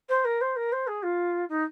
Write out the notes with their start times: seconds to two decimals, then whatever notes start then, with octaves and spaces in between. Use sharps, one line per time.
0.08 C5
0.24 A#4
0.41 C5
0.56 A#4
0.72 C5
0.87 G#4
1.02 F4
1.49 D#4